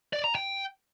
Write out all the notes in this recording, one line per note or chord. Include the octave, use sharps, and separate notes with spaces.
D5
A#5
G5